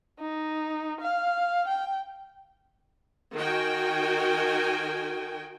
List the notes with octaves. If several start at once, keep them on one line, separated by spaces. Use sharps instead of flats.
D#4
F5
G5
D#3 F#4 G5 G#5